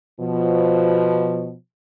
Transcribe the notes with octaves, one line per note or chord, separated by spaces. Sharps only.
B2 F3